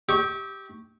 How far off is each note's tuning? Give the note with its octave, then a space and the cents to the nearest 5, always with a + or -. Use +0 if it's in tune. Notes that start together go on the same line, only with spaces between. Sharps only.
G4 +0 E5 -40 C#6 +0